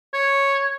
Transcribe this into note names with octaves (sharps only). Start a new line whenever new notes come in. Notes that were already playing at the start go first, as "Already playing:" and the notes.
C#5